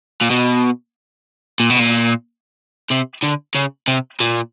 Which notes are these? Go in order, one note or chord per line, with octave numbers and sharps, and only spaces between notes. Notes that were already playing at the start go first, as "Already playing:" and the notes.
A#2
B2
A#2
B2
A#2
C3
D3
C#3
C3
A#2